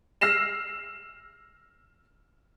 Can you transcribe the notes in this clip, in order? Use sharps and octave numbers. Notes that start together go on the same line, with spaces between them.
E6 F6 A#6 C7 E7